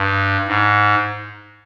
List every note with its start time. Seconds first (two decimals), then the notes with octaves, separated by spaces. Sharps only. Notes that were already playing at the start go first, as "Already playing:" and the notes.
Already playing: G2
0.48 G#2